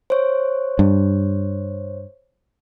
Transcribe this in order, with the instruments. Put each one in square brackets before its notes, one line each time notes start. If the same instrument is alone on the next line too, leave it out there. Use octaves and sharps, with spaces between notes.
[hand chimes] C5 C#5
[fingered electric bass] G2